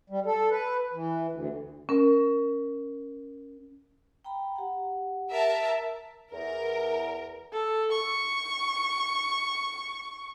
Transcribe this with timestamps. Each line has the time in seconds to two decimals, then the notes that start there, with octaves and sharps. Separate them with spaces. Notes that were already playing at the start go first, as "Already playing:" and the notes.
0.10 G3
0.26 A4
0.51 B4
0.93 E3
1.32 D2
1.89 C#4 A#4
4.25 G5 A#5 B5
4.56 G4 F#5
5.32 A#4 E5 A5
6.33 E2 A#4
7.53 A4
7.92 C#6